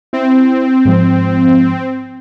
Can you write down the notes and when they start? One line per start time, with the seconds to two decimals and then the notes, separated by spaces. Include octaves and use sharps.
0.13 C4 E4
0.85 G#2 F3